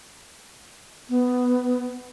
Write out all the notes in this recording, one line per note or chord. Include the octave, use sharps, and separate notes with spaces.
B3